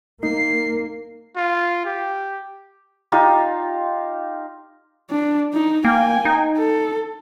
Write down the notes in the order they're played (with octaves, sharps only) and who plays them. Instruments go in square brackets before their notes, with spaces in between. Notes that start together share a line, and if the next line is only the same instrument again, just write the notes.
[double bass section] A#3 [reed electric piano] D#4 [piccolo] C7
[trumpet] F4
G4
[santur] D#4 F4 G4
[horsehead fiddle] D4
D#4
[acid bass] A#3 [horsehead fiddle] G5 G#5
[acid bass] D#4
[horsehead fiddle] A4